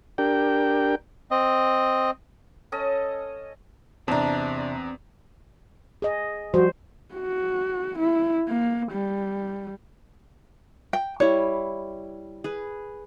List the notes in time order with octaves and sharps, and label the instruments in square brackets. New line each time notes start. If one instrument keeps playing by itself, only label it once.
[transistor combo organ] D4 G4 A#4 G5
[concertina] C4 D#5
[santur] C#4 A4 D#5
[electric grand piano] E2 A#5 [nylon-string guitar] C3 A5 [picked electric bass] C4 [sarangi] D4
[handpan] G#4 D#5
[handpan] F3 G3 C5 [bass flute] F#4
[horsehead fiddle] F#4
E4
A#3
G3
[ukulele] G5
[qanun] G3 E4 [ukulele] C#5
[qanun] G#4 B4